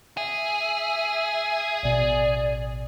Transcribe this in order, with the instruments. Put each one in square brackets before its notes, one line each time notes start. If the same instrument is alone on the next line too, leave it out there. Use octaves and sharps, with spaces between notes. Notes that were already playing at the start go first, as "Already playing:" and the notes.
[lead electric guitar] G#4 [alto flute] E5
[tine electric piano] A1 B2 [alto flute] D5